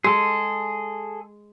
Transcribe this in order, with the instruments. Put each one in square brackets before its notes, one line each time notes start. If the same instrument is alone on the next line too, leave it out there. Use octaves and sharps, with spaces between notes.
[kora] G#3 [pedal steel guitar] G#4 A4